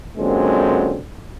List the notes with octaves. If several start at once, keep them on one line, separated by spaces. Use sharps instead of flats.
F#2 A#2 D3 G#3 C4